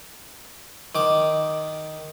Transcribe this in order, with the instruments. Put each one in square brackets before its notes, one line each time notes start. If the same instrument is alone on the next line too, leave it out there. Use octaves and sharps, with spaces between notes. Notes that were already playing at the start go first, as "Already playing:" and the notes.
[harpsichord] D#3 D6